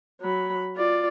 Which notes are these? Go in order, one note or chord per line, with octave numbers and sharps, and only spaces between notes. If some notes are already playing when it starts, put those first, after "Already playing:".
F#3 B5
F4 D5